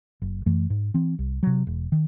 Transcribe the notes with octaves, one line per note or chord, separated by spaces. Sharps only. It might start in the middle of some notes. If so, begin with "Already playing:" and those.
F#1
F#2 E3 A3
G#2
E3 C4
C2
C3 F#3
E1
D#3